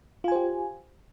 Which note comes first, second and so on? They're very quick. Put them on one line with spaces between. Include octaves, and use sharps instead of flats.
F4 G#5 C5 G4